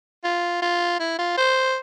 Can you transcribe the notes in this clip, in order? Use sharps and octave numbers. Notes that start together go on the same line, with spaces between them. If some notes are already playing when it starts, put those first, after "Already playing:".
F4
F4
E4
F4
C5